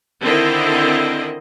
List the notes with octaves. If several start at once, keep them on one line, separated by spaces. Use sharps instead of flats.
D3 D#3 C4 E4 D#5